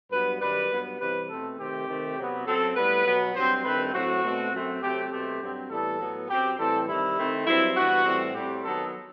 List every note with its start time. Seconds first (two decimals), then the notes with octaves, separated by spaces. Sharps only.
0.11 G2 F#3 B3 B4
0.41 F#2 D#3 G3 B4
0.70 G2 F#3 B3
0.99 C3 E3 G3 B4
1.29 B2 A3 C4 A4
1.58 C3 D#3 A3 C4 G4
1.88 C3 D#3 A3 C4
2.17 C3 F#3 B3
2.46 F#2 F#3 C4 A4
2.76 A2 G3 B3 B4
3.06 B2 F#3 B3
3.35 G2 F#3 C4 C5
3.64 G2 D#3 A3 C4 B4
3.93 A2 F#3 C4 F#4
4.23 B2 A3 C4
4.52 F#2 F#3 A3 C4
4.82 C3 F#3 A3 C4 G4
5.11 B2 F#3 A3 C4 G4
5.41 G2 F#3 C4
5.70 A2 E3 G3 B3 A4
6.00 A2 F#3 B3
6.29 F#2 F#3 C4 G4
6.58 A2 E3 G3 C4 A4
6.88 C3 D#3 G3 E4
7.17 D#3 A3 C4
7.46 G2 F#3 C4 E4
7.76 G2 E3 B3 F#4
8.05 A2 E3 G3 C4
8.34 A2 G3 C4 G4
8.64 D#3 F#3 B3 A4